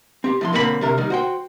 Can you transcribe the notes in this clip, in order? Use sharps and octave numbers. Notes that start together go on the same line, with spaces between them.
C4 G4
A2 F3 C6
B1 D3 A#3 C4 A4 B5
D2 C3 A#4
D#3 G3
F#4 C5 G5